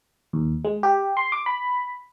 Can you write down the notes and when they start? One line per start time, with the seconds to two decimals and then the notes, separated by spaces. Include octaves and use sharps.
0.33 D#2
0.65 G#3
0.83 G4
1.17 C6
1.32 D6
1.46 B5